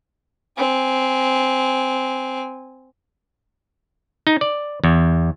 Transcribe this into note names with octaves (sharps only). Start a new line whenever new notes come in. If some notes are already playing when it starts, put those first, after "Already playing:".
C4 G#5
D#4
D5
E2